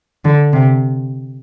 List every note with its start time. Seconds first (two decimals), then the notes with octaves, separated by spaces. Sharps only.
0.25 D3
0.53 C3